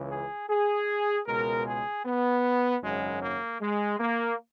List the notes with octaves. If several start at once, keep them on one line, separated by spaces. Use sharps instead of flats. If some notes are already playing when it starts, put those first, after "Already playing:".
Already playing: C#2 C#3 E3
G#4
G#4
C#2 B2 G#3 A#4
G#4
B3
G#1 F#2 C#3 F#3 G#3
A#3
G#3
A#3